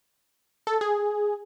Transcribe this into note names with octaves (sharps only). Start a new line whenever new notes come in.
A4
G#4